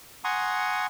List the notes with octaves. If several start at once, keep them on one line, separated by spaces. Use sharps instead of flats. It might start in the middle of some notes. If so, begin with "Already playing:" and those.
F#5 G#5 A#5 C6 C#6 D#6